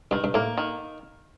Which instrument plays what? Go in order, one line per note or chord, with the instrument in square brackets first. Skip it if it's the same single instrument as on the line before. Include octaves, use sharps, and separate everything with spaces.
[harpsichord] G2 [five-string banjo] D#3
[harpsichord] G2
[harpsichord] A2 [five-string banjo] A#3
[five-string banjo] D#3